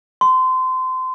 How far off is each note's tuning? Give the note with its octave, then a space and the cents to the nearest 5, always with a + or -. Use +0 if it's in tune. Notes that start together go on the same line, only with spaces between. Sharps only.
C6 -25